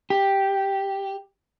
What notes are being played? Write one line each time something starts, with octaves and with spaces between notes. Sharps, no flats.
G4